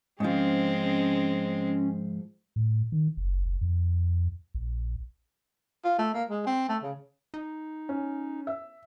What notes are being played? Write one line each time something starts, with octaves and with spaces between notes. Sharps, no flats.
G#2 F3 G#3 C4 C#4
A2
D#3
F#1
F#1
F2
A#1
F4
A3
A#3
G#3
C4
A3
C#3
D#4
C#4
E5